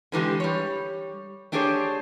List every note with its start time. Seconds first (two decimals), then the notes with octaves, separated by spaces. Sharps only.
0.12 D3 E3 G#3 G4
0.40 G3 C#5
1.52 A3 D4 G4 G#4 C5 C#5